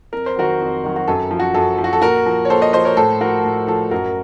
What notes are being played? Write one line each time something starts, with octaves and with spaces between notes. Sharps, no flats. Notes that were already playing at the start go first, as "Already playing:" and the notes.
F2 A#4
C5
D#3 F#3 F#4 A#4
F2
D#3 F#3
F#4
F#2 A4
F3
F#4
F#2 A4
F3
F#4
A4
A#2 F#4 A#4
F3
C#5
A#2 A4 C5
C5 D#5
F3 C5 D#5
A#4 C#5
A2 A4 C5
F3 F#4 A#4
A2
F3 A4
F#2 F#4 A#4